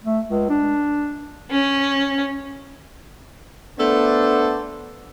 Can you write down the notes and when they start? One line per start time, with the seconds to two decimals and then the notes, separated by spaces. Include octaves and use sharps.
0.04 A3
0.28 C#2
0.50 D4
1.51 C#4
3.79 A3 B3 D4 A4 C5 D5